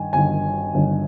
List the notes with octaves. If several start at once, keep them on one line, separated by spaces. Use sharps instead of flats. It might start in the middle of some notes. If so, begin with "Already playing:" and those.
Already playing: G2 D#3 G#5
G1 G2 D#3 G#5
G1 G2 D#3